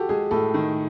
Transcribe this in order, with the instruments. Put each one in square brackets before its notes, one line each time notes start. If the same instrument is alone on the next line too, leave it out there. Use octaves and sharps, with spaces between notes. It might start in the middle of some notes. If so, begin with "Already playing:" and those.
Already playing: [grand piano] F#4 G4 A4
[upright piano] G#3 [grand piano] G#4
[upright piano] A2 [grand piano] A4
[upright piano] D#3